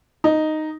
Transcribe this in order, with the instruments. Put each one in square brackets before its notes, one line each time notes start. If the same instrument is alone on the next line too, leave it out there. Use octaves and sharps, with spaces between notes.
[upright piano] D#4